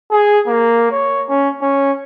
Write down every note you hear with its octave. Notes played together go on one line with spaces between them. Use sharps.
G#4
A#3
C#5
C#4
C#4